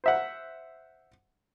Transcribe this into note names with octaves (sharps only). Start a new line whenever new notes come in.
C5 E5 F#5